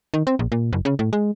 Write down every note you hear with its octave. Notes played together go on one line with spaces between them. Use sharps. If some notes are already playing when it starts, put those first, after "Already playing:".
D#3
C4
A#1
A#2
F#1
C#3
A2
G#3